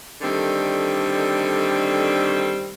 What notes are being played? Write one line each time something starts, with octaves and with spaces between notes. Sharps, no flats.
D3 D#3 G3 A3 C4